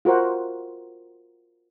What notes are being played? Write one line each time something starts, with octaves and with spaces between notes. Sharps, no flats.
F4 F#4 A#4 C5 F#5